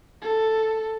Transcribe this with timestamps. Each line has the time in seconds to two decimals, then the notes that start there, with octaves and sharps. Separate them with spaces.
0.22 A4